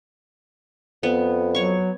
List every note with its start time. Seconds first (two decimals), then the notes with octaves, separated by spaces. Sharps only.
1.03 F2 B3
1.55 F#3 C#5 C#6